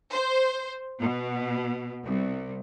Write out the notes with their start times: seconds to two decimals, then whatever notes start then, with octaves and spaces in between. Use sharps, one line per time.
0.12 C5
1.00 B2
2.05 C2